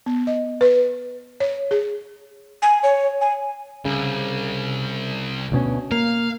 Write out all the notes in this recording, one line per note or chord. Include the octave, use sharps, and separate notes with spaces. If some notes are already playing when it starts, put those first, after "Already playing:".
B3
D#5
B4
C#5
G#4
G#5
C#5
G#5
C2 C#3
D2 B2 C#4
A#3 F5